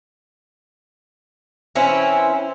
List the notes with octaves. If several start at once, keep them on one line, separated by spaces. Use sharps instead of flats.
E3 C4 C#4 E4